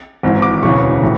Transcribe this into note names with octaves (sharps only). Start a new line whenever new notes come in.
G#1 G#2 E3
D6
E1 D2 C#3 E3 C#6
A2 E3